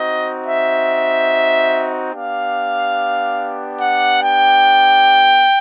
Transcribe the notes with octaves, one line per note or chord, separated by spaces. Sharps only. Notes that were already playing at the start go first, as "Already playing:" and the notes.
Already playing: C4 D#4 F#4 D#5
E5
B3 D4 G4 F5
F#5
G5